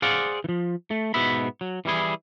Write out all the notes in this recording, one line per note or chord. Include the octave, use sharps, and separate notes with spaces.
G#4 C5 D5 F5 F#5
E3 F3
A3
G#2 B2 B3 E5 B5
F#3
E3 G3 E4 G#4